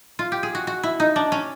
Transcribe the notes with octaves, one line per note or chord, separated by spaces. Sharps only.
F4
G4
G#4
F#4
F#4
E4
D#4
D4
C#4